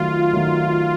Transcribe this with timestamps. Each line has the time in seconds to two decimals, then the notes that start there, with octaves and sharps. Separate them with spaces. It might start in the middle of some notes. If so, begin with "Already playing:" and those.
Already playing: D#3 F#3 A3 F4
0.33 D#3 F#3 A3